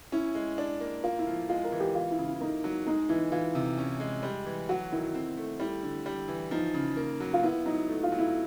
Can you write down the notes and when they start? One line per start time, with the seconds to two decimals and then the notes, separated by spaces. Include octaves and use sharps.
0.12 C#4 E4
0.35 G#3
0.58 D4
0.80 A#3
1.04 A#3 F4
1.19 E4
1.27 F3
1.49 G#3 F4
1.65 A#4
1.72 E3
1.80 G4
1.95 E3 F4
2.11 E4
2.18 C#3
2.25 E4
2.40 A#3 D#4
2.64 F#3 D#4
2.86 G#3 D#4
3.09 E3 E4
3.32 E3 F4
3.55 C3
3.78 C#4
4.00 G#3
4.23 G3
4.46 E3
4.69 F#3 F#4
4.92 D#3 E4
5.15 C4
5.37 A3
5.60 G3 E4
5.83 D3
6.06 G3
6.28 E3
6.51 F3 D#4
6.74 C#3
6.97 A#3
7.20 F#3
7.33 F4
7.43 B3 E4
7.66 F#3 D#4
7.89 A3
8.03 F4
8.12 F#3
8.18 E4